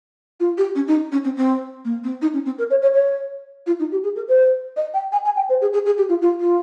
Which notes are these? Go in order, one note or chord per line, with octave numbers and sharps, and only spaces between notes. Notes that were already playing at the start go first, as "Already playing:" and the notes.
F4
G4
C#4
D#4
C#4
C4
C4
A#3
C4
D#4
C#4
C4
A#4
C#5
C#5
C#5
F4
D#4
G4
G#4
A#4
C5
D#5
G5
G#5
G#5
G5
C5
G#4
G#4
G#4
G4
F4
F4
F4